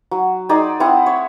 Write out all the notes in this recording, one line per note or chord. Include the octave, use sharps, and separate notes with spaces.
F#3
D#4 G#4 C5 D5
C4 E4 F#5 D#6
C#5